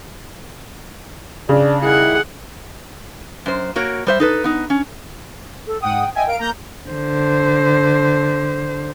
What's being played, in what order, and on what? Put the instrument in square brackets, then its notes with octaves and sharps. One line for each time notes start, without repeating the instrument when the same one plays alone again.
[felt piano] C#3 [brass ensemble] D4
[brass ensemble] D#3 G3 E4 [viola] G#4 F#5
[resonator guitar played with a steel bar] F#2 C5
A#3 F#4 A#4 C#5
G3 C5 E5
D#4 A4 B4
B3 D#4
C#4
[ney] A4
[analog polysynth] G#2 F#5 D#6 [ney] G5
[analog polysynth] D#5 E5 G#5 [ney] G5
[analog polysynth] A#4 F5 D7
[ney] A#3 [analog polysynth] A#5 G6
[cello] D3 C5